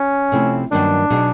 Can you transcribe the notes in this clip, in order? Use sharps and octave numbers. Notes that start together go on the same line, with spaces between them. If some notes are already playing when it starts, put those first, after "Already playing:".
Already playing: C#4
C3 F3 A3 C4 E4
G2 D#3 F#3 A#3 C#4 D4
B2 F#3 B3 D#4 G#4